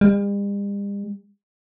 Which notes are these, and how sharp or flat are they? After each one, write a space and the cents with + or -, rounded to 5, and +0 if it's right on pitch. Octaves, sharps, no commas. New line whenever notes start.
G3 +45